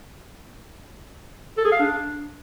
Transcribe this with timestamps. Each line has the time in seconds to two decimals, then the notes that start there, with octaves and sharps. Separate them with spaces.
1.57 A4
1.64 G#4
1.72 F5
1.79 D4